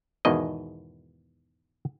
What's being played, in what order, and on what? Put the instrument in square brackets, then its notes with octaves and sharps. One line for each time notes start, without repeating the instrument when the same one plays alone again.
[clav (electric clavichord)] E2 G#2 B2 D#3 D#5